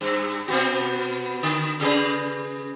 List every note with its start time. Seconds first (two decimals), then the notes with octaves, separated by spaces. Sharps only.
0.01 G2
0.48 B2 B3 F#4
1.43 D3
1.80 C#3 G#4 B4